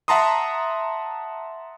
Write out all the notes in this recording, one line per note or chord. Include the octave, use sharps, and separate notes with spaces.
E5 F#5 A5 A#5 C6 D#6